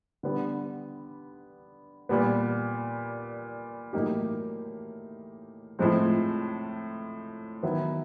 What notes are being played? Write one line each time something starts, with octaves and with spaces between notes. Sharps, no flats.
D3 G3 B3
A#2 G3 B3
A2 F#3 A#3 D#4 G4
A2 F3 G#3 C4
D#3 F#3 B3 E4